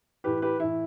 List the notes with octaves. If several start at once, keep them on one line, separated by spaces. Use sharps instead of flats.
A2 E3 G4 B4
G4 B4
A2 E3 E4